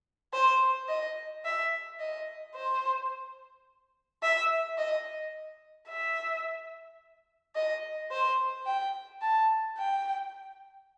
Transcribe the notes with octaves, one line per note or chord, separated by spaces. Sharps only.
C5
D#5
E5
D#5
C5
E5
D#5
E5
D#5
C5
G5
A5
G5